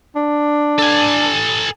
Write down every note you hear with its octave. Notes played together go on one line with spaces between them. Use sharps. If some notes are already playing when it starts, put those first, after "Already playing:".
D4
A4 G#5